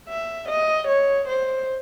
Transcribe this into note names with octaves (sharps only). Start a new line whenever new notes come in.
E5
D#5
C#5
C5